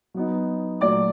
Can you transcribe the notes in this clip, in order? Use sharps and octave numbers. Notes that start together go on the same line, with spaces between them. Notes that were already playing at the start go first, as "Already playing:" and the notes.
F#3 B3 D#4
A#2 F#3 A3 D5 D6